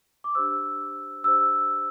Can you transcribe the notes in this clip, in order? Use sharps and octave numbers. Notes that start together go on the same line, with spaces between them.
D6
D4 G4 C5 E6
D4 G4 C5 E6